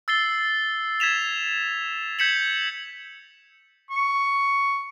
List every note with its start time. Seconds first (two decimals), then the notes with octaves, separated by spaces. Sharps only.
0.08 E6 A6 C7 G7
1.00 G#6 B6 E7 F7
2.19 G6 G#6 B6 C#7 E7 F#7
3.91 C#6